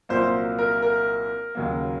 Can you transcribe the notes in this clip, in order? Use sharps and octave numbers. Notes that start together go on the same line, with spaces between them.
C2 A#2 F#3 A#3 C5
A#4
A#4
D#2 C#3 F#3 A#3